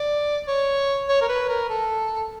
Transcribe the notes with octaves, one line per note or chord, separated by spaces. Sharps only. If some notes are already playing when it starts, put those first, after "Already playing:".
Already playing: D5
C#5
C#5
A#4
B4
A#4
A4